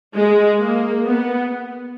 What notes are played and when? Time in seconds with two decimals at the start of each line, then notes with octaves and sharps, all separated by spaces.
0.16 G#3
0.61 A#3
1.05 B3